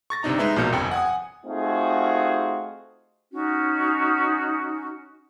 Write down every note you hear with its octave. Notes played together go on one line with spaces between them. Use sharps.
C#6 A6 A#6
G1 C3 D4 D#4 A#5
G#3 D#4 B4 E5
A#1 B2 F3 A#4 G6 C#7
G1 F2 C3 G5 G#5
F#5 G#5 D#6
A3 C4 D#4 F4 F#4 G#4
C#4 D#4 F#4